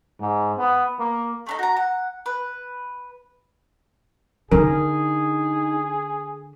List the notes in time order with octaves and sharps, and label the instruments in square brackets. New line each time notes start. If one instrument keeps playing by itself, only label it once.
[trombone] G#2
B3
A#3
[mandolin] A3 D4 D#4
F#4 A#5
F#5
B4
[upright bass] D3 [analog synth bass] D#4 [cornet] G#4 [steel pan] A#4